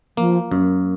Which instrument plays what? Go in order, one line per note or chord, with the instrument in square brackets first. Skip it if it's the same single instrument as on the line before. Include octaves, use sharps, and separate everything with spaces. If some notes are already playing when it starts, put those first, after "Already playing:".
[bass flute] F3 [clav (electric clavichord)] A#3
[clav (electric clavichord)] F#2